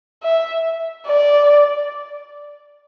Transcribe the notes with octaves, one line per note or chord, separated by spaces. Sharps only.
E5
D5